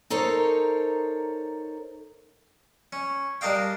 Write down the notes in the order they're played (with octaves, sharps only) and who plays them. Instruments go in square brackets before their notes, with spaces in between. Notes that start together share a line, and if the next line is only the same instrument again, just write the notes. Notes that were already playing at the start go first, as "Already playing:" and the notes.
[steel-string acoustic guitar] D#4 A4 A#4 C5 C#5
[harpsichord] C#4
G3 D4 A#4 D#5 F5 G5